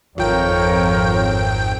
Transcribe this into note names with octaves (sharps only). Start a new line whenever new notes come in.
G#1 F2 F4 A#4 C#5 G5